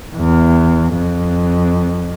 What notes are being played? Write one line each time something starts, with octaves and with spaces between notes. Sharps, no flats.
E2
F2